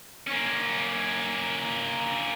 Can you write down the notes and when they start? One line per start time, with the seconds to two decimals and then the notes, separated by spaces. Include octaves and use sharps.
0.27 A#3 C#4